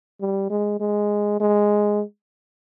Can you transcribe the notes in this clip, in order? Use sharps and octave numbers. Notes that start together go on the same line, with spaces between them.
G3
G#3
G#3
G#3